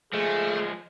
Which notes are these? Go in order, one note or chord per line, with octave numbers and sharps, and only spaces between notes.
F3 G#3 A3 G#4